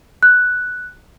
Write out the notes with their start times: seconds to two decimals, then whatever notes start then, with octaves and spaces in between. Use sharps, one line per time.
0.23 F#6